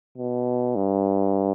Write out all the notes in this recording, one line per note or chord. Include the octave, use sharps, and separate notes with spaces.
B2
G2